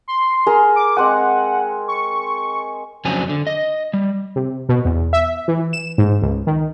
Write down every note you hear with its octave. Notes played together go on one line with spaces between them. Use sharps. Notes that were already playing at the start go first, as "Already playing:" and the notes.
C6
G#4 A#4 A#5
D6
G#3 C4 F#5 G#5
C#6
F2 C#3 F#3 D4 C5 G#5
D3
D#5
G3
C3
B2
E2
E5
E3
E7
G#2
C#2
D#3